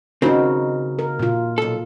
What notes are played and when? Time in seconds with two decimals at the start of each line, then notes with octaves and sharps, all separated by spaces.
0.22 C#3 C4 D#4 F#4 A#4
0.99 A#4
1.19 A#2 F4
1.58 B1 A4